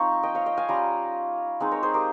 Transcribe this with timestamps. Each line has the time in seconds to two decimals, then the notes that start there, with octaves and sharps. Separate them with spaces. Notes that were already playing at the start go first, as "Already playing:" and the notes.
Already playing: F3 C4 D#4 A#5 C#6
0.23 D#5 G5
0.35 C#5 F5
0.46 D#5 G5
0.57 F5 G#5
0.69 G3 C#4 F4 G5 A#5
1.60 G#3 C4 D#4
1.71 A#4 C#5
1.83 G#4 C5
1.94 G4 A#4